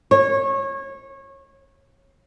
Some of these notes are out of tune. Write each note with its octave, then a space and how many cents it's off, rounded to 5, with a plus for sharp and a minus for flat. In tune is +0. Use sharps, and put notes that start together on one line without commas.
C#5 -25